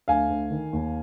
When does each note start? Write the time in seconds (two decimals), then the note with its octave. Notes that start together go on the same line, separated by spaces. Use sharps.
0.08 D2 F5 G#5
0.29 D2
0.51 D#3
0.73 D#2